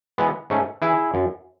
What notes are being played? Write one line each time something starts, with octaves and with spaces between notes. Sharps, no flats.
E3 G#3 B3
G#2 A3 C#4
E3 E4 G#4
F#2